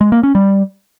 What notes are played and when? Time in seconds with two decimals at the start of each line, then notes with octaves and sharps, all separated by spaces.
0.01 G#3
0.12 A#3
0.23 C#4
0.35 G3